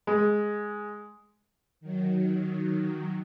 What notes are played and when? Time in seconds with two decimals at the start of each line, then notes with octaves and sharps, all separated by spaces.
0.07 G#3
1.81 D#3 F#3